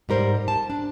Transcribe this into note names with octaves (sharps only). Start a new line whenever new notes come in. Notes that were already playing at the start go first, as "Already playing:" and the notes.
G#2 G3 A#4 C5
A5
D4